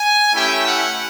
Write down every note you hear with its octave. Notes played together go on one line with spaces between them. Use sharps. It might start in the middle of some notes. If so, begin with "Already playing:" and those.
Already playing: G#5
A3 C#4 E4 G4 G5
F#5